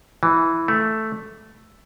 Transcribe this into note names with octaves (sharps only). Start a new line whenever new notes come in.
E3
A3